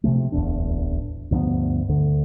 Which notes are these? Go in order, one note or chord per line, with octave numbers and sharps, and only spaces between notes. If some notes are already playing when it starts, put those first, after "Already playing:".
C3 D#3 F3 A3
D1 A1 E2 D4
D2 G2 F3 B3
D2 D3